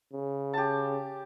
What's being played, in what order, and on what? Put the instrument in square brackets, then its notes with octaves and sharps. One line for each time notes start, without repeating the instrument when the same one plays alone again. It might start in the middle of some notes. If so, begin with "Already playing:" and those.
[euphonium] C#3
[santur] G4 A5